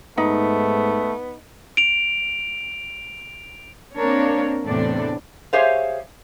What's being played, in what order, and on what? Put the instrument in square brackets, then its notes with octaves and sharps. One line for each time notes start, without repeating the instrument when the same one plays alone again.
[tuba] G#2 [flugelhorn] A3 [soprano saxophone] B3 [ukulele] D#4
[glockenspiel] D7 F7
[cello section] A#3 C4 D4 A#4 C#5
E2 A2 C3 D4 A4 D5
[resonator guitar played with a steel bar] G4 G#4 C5 C#5 E5 F5